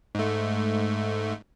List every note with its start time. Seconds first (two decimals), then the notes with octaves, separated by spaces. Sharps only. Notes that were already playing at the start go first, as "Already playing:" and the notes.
0.15 G#2 A3